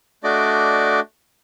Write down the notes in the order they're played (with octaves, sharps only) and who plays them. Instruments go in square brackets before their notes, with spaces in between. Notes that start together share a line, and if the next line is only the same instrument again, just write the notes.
[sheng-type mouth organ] A3 D4 F#4 D5 D#5 D6